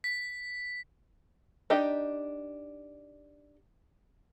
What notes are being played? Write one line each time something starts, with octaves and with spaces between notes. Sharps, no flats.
B6
D4 D#4 G4 D#5